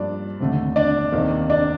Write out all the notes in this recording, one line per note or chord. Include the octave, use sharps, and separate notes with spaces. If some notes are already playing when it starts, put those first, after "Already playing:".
Already playing: G2 F3 A#3 D4 D5
F1 D#2 D3 A3
D4 D5
F1 D#2 D#3 A#3
D4 D5